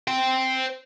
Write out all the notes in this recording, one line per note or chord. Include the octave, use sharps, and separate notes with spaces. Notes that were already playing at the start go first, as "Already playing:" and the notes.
C5 G5